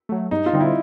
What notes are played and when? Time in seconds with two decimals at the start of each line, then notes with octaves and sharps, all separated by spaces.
0.09 F#3 A3
0.31 G2 D#4
0.46 F4
0.53 D3 G3 C4 D#4
0.61 E4